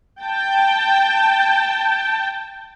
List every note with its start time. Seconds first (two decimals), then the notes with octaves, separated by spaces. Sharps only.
0.22 G5 A5